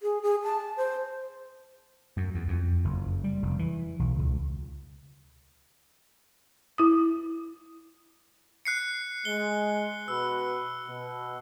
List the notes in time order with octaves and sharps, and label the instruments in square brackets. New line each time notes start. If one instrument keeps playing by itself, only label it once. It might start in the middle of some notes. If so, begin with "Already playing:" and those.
[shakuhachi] G#4
G#4
A5
C5
[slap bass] F#2
E2
F2
F#1
G3
F1
E3
B1
C#2
[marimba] E4 D#6
[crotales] F#6 C7 C#7
[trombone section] G#3 [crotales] G7
[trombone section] B2 F#4 B4 [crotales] E6
[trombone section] B2